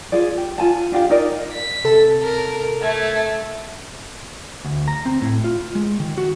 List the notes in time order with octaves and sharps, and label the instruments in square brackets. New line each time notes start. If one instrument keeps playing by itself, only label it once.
[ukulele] F4 G#4 D5
G4
F4 G#5 A5
D4 F4 G4 F5
D#4 A#4 D5 D#5
[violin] B6
[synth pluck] C3 A4 A5
[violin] A#4
[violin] A3 [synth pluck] G#6
[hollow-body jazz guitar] D2
A#5
C4
A2
F4
G#3
D#3
F#4